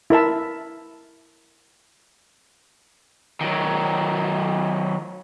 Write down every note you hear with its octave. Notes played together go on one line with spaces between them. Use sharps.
E4 A#4 E5 A5
D#3 F#3